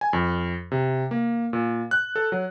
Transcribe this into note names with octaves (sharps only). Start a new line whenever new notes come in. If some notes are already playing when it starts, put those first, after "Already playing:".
G#5
F2
C3
A#3
A#2
F#6
A4
F#3